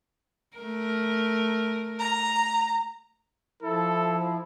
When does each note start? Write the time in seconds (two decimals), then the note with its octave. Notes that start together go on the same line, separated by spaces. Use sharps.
0.57 A3 A#4
1.99 A#5
3.63 F3 E4 A4